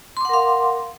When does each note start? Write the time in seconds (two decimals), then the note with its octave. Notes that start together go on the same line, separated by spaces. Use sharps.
0.17 C6
0.21 D6
0.25 F#5
0.29 A#4
0.33 F5